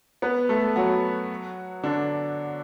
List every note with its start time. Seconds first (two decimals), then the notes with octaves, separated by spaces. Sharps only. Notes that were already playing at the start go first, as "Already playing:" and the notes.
0.22 B3 B4
0.49 A3 A4
0.76 F#3 F#4
1.83 D3 D4